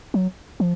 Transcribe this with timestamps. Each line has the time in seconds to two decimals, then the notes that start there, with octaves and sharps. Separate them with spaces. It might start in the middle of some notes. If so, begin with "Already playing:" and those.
0.14 F#3
0.60 F3